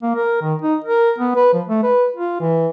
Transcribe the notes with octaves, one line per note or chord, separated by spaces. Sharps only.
A#3
A#4
D#3
D#4
A#4
B3
B4
F3
A3
B4
F4
E3